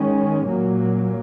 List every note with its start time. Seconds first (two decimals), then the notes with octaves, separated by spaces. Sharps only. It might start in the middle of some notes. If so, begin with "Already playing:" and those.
Already playing: D#3 G#3 C#4
0.46 A#2 F#3 A#3